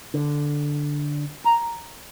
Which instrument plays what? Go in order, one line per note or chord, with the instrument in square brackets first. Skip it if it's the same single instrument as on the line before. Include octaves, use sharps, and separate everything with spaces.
[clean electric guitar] D3
A#5